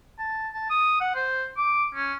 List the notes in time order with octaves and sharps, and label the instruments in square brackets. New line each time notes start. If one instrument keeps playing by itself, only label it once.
[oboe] A5
A5
D#6
F#5
C5
D6
C#4